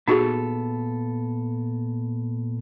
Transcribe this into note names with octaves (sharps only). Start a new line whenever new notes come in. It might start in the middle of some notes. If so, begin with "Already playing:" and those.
A#2 B3 D#4 F#4 G#4 A4